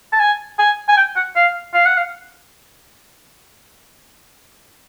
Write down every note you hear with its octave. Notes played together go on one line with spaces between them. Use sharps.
A5
G#5
G#5
G#5
G5
F#5
F5
F5
F#5
F5